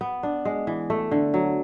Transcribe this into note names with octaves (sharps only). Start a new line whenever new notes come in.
B3
D4
G#3
E3
A3
D3
F#3